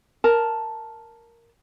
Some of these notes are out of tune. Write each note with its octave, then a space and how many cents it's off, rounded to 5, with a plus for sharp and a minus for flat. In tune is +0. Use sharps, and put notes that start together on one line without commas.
A#4 +0 A5 +0